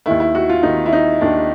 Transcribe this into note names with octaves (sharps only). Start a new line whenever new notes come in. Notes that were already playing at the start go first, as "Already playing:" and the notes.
D#2 D#3 E4
E4
F#4
F4
D#2 D#3 D#4
E4
D#4
D#2 D#3 D4